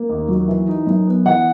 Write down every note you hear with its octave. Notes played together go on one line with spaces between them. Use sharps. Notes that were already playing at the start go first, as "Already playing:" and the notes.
Already playing: A#3
D#2
F#3
E3
D#4
F#2
B3
E3 F#5